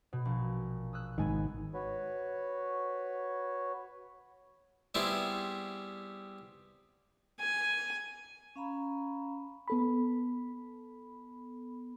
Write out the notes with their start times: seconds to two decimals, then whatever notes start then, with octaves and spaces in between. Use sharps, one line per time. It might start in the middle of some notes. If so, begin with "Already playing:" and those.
0.13 B2
0.25 A#1
0.93 D#6 E6 F#6
1.18 G#1 G#2 D#3 B3 G#5
1.74 F#4 B4 C#5
4.95 G3 B3 C4 E4 G#4
7.39 G#5
8.56 C#4 F5 A#5 B5
9.68 B3 A4 B5